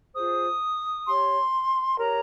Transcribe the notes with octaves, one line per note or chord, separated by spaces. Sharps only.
F4 G#4 C5 D#6
G4 C#5 C6
G4 A#4 C#5 A#5